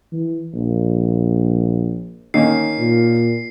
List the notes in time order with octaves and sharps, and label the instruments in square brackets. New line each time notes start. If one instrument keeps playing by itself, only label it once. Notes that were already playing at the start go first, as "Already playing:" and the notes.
[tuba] E3
A#1
[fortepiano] D#3 A#3 C#4 [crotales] C7
[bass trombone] A#2